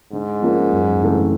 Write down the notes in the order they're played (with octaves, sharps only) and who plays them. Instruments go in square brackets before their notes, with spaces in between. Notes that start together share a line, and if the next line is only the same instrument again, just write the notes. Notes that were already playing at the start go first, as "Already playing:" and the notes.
[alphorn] G#2 [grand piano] D3
[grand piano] F3 A#3 C#4 F4
F#2
C#3 E3 A3 C4